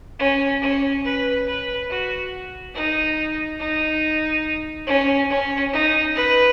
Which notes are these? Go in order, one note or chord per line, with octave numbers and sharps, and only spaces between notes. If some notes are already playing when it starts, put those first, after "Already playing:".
C#4
C#4
B4
B4
F#4
D#4
D#4
C#4
C#4
D#4
B4